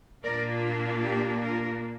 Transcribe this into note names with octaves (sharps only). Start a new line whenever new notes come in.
A#2 A#3 D4 F4 A#4 D5
G4
F4 A#4